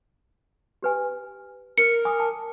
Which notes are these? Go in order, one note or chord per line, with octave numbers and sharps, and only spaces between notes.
G4 B4 G#5
A#4 C#7
G#5 D6 D#6
A5